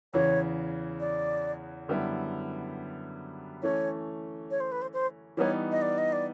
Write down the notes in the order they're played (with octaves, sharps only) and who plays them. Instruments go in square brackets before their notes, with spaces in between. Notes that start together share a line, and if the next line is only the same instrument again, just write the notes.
[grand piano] E2 C#3 E3 [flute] C#5
[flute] D5
[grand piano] F#2 D3 G3 B3 E4
[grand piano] E3 A3 C#4 [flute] C#5
[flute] C#5
C5
B4
C5
C5
[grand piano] E3 G3 B3 D#4 [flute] C#5
[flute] D#5
D5
D#5
D5